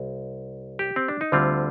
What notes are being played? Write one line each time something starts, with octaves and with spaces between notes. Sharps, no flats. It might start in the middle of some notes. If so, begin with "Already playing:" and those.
Already playing: C2
G4
C4
D4
D#4
D2 D3 G3 C4 F4